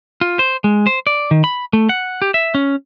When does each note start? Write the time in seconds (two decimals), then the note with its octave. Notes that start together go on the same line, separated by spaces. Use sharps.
0.21 F4
0.39 C5
0.64 G#3
0.87 C5
1.07 D5
1.31 D#3
1.44 B5
1.73 A3
1.89 F#5
2.22 G4
2.34 E5
2.55 C#4